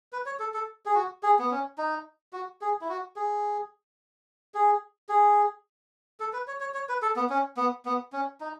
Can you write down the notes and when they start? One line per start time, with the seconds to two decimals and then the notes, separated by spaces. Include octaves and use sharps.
0.13 B4
0.26 C#5
0.40 A4
0.54 A4
0.86 G#4
0.95 F#4
1.23 G#4
1.39 B3
1.51 C#4
1.78 D#4
2.33 F#4
2.61 G#4
2.81 E4
2.89 F#4
3.16 G#4
4.54 G#4
5.09 G#4
6.20 A4
6.33 B4
6.47 C#5
6.60 C#5
6.74 C#5
6.89 B4
7.02 A4
7.16 B3
7.30 C#4
7.57 B3
7.85 B3
8.13 C#4
8.41 D#4